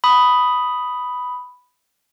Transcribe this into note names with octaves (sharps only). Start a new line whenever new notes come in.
B5 D#6